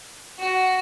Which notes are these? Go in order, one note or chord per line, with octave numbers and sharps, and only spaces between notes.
F#4